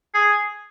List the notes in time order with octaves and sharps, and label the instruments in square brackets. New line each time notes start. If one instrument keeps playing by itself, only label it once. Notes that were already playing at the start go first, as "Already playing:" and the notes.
[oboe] G#4